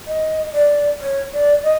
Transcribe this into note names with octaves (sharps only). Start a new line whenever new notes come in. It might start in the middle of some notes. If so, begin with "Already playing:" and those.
D#5
D5
C#5
D5
D#5